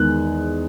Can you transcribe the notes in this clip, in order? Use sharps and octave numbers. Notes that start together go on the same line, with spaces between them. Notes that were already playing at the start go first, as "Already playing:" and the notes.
Already playing: E2 D#3 G#3 F#6